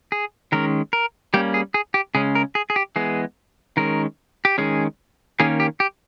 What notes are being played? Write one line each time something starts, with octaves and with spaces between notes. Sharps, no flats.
G#4
D#3 G#3 C#4 A#4
A#4
G3 A#3 C#4 G4
G#4
G#4
G4
C#3 G#3 C#4 G#4
A#4
G#4
G#4
G4
E3 G#3 B3 G#4
D#3 G#3 C#4 A#4
G4
D#3 G#3 C#4 G#4
D#3 A#3 C#4 G#4
G4
G4